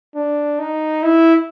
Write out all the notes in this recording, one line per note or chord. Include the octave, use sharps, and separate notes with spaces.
D4
D#4
E4